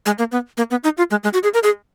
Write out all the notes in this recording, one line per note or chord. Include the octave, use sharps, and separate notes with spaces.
G#3
A#3
B3
A#3
B3
D#4
F4
G#3
G#3
F#4
G#4
A#4
G#4